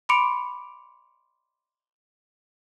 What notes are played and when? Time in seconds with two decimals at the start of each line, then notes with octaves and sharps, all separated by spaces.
0.09 B5 C6 D6 C#7 D7 F7